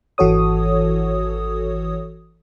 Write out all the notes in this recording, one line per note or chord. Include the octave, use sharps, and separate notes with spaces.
G#1 E3 F#4 A4 C#5 D#6